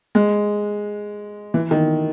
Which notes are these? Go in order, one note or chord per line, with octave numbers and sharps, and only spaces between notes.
G#3
E3
D#3